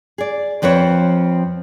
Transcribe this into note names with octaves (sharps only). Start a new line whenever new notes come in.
G#4 D5
F2 F3 C4 B4 C#5